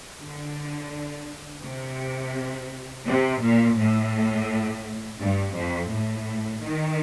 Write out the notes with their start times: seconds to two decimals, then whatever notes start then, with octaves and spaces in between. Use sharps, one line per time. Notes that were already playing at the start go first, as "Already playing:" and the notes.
0.21 D3
1.65 C3
3.07 C3
3.42 A#2
3.78 A2
5.20 G2
5.56 F2
5.91 A2
6.64 D#3